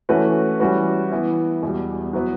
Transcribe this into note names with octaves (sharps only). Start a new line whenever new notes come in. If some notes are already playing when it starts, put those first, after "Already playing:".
E3 A3 C#4 F#4 B4
E3 G3 C#4 F#4 B4
E3 B3 E4
E2 B2 G3
F#3 B3 E4 B4